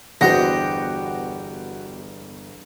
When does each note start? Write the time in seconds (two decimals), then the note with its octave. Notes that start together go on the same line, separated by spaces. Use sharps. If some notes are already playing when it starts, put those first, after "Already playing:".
0.21 G1 E2 F#4 G4 C5 D#5 F#5 A#6